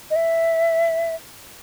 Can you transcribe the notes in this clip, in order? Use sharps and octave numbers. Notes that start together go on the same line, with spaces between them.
D#5
E5